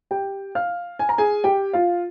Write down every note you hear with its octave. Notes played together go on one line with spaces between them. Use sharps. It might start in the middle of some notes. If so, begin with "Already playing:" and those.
G4 G5
F5 F6
G#5
A#5
G#4 G#5
G4 G5
F4 F5